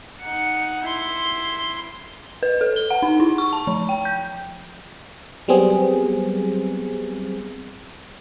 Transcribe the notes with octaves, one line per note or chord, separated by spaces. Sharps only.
D#4 F#5
E4 C6
B4
A4
G7
F#5
D#4
E4
C#6
A5
F3
G5
G6
F#3 G3 B3 C4 G#4